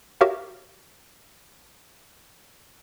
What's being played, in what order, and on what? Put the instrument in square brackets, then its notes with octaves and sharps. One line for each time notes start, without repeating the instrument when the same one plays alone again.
[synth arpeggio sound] F#4 G4 A#4 C#5 E5 F5